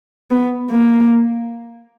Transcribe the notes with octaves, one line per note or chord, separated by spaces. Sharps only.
B3
A#3